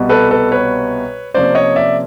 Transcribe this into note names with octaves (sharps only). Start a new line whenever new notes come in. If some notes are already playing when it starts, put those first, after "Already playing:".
Already playing: C2 B2 G3 B3
A4 B4
A4 B4
B4 C#5
C3 F3 A#3 C#4 C5 D5
C#5 D#5
D5 E5